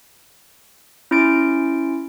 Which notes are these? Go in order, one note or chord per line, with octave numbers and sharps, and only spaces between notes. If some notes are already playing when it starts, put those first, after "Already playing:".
C#4 E4 C6 A6 D7